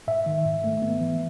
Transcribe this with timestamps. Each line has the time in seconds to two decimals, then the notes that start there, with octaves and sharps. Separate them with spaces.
0.07 G#2 E5
0.26 D#3
0.45 G#2
0.64 A3
0.82 B3
1.01 E3